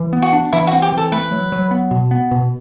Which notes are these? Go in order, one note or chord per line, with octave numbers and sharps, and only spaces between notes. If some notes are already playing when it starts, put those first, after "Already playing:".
Already playing: E3
B3
F#4
D4
E3 E4
F#4
C4
G4
E3
A4
A3 B4
F#3
F#3
B3
B2
B3
B2